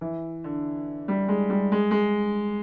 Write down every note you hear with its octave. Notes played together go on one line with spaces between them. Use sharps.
E3
D3
G3
G#3
G3
G#3
G#3